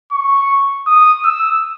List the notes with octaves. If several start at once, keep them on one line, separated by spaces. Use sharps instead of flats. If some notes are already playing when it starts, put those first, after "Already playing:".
C#6
D#6
E6